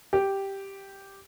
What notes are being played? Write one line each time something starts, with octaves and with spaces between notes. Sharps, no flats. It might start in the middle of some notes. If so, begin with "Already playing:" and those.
G4